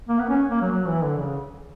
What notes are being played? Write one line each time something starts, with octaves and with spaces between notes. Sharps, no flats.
A#3
B3
C#4
A#3
F#3
F#3
E3
D3
C#3